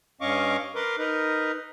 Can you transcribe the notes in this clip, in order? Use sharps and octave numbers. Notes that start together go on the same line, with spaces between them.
G2 C#4 D#5 F5 C#6 D6
A#4 B4 C6 D6
D#4 A#4 B4